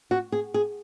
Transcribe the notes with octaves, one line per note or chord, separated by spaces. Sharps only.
F#4
G#4
G#4